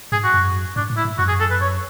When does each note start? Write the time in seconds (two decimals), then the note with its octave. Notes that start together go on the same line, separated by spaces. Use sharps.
0.12 G#2 G#4
0.24 F#4
0.34 F#2
0.76 G#2 D4
0.90 A2
0.97 E4
1.05 G#2
1.18 F#2 F#4
1.29 G#4
1.40 A4
1.50 B4
1.61 C#5